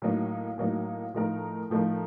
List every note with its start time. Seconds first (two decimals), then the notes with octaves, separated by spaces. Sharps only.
0.02 A2 F#3 A#3 D#4
0.58 A2 F#3 A#3 D#4
1.14 A2 F3 A3 D#4 A#4
1.70 A2 F3 A3 D#4 A#4